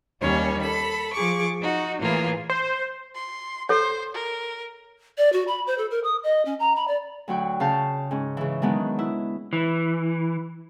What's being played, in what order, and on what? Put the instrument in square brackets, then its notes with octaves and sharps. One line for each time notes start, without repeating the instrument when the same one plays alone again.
[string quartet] D#2 D#3 G3 C#4 C#5
A4 B5
F3 G#4 C#6 D6
D#4 F#4
A2 E3 A#3 F4 G#4
[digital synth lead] C5
[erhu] C6
[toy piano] A4 C#5 [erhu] C5
[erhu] A#4
[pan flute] D5
F#4
B5
C5
A4
A#4
D#6
D#5
C#4
A#5
B5
D5
[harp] D2 F#3 F#4 G5
C#3 F5 A5 G6
G#2 C#4
C#3 E3
D#3 F#3 G#3 B3 D4 D#4
E4
[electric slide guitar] E3